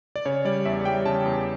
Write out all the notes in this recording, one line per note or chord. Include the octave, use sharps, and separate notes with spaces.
D5
C#3 C#5
G3 D5
E2 E5
G3 G5
C#3 A5
E2